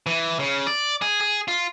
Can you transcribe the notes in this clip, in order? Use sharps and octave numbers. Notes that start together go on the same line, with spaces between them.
E3
C#3
D5
G#4
G#4
F4